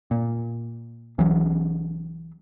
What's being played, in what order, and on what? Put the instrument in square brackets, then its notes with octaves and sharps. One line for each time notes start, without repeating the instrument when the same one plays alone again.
[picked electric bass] A#2
C2 E3 F#3